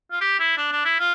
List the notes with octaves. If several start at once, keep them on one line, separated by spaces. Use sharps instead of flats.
F4
G4
E4
D4
D4
E4
F4